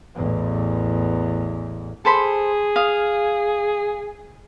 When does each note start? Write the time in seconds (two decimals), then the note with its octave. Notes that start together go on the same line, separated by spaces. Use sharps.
0.15 A1 E2
2.05 G#4 A4 C5 B5
2.76 F5 D#6